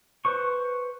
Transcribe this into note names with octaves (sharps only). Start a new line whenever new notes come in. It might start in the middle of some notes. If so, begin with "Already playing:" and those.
B4 C5 C#6